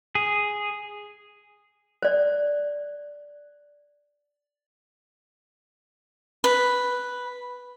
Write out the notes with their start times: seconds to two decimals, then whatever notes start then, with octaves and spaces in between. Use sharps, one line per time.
0.15 G#4
2.02 C5 D5
6.44 B4